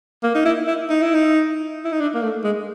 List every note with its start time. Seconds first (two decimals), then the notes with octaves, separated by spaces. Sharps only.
0.23 A#3
0.35 D#4
0.45 E4
0.67 E4
0.89 D#4
1.02 E4
1.14 D#4
1.85 E4
1.92 D#4
2.00 D4
2.15 A#3
2.23 A3
2.44 G#3